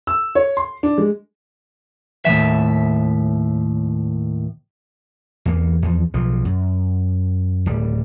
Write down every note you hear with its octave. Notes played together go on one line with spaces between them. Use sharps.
E6
C#5
C6
D4
G#3
D#2 A2 E3 F#3 E5
E2 A#3
E2 F3
B1 F3
F#2
D1 G3